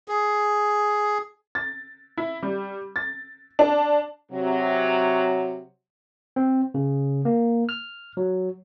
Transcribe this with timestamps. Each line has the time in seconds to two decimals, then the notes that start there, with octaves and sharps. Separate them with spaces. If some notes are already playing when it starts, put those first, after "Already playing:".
0.08 G#4
1.55 A6
2.17 E4
2.43 G3
2.96 A6
3.59 D4
4.32 C3 F#3
6.36 C4
6.74 C#3
7.25 A#3
7.69 F6
8.17 F#3